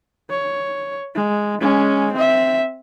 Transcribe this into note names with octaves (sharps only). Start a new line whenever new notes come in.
C#5
G#3
G#3 C#4
C4 E5